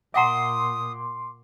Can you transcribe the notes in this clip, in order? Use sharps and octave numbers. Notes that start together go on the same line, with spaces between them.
A#2 E5 F#5 A#5 C6 D6 D#6